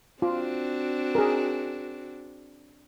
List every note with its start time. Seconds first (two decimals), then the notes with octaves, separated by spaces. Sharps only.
0.22 C4 D4 F4 F#4
1.15 G#4 A#4